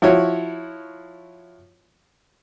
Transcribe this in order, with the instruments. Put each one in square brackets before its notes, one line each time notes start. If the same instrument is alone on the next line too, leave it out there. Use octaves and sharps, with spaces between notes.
[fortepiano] F3 E4 F#4 C#5